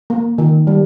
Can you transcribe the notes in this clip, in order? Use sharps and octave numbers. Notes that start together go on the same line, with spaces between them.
A#3
D#3
G3